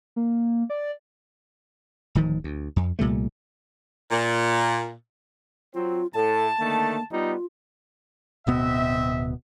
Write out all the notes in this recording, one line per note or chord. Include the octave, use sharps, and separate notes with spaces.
A#3
D5
D1 D#3 F3
D2
F2
C2 A#2 G3 A3
A#2
F#3 C4 F4
A2 A4 A5
D3 D#3 A3 A#3
G3 B3 D#4 F4
D1 B2 B3 C4 D#5 E5